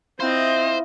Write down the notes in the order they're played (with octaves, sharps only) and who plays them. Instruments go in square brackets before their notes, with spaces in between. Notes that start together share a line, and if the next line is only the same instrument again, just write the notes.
[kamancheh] C4 D#5 [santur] E4 F4 [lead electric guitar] C5